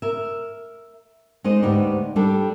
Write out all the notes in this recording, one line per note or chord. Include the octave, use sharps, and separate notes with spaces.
A#4 E5
G#3 D#4 C5 D#5
D2 G#2 B3 D#4 G4 D5
G3 D4 G4 A4